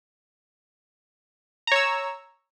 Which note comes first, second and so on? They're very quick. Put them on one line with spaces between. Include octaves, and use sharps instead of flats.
A#5 C#5 E6